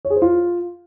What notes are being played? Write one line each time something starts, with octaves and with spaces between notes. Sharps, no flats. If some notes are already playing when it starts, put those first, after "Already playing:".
C#5
G#4
C5
F4